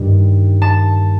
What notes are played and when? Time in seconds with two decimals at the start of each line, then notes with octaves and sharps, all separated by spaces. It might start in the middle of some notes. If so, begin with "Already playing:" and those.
Already playing: G2 D#3 G3
0.62 A5